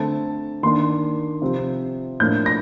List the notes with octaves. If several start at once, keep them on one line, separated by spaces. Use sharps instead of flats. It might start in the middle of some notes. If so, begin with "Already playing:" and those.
Already playing: D3 A3 C4 A5
D#3 A#3 D4 C6
C3 F3 C4
A2 F3 A#3 D4 G6
A#6